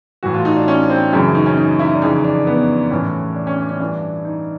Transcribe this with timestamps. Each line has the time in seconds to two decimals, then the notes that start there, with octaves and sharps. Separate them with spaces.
0.23 A2 E3 F#4
0.34 F4
0.45 D#4
0.57 D4
0.68 C#4
0.90 C4
1.13 F#2 C#3 E3 C#4
1.35 D#4
1.46 C#4
1.58 D#4
1.79 E4
1.95 D4
2.02 F2 C#3 E3 D#4
2.24 D4
2.47 B3
2.91 A2 E3 C#4
3.36 D4
3.47 C#4
3.58 D4
3.69 C#4
3.80 G2 E3 D4
4.25 D#4